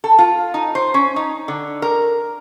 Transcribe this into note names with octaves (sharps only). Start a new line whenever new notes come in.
A4
F4
D#4
C5
C#4
D#4
D3
A#4